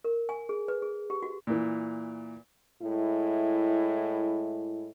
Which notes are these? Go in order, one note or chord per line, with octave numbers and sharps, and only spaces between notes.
A#4
G#5
G#4
B4
G#4
G4
F#4
A#2 E3
A2 G#3 E4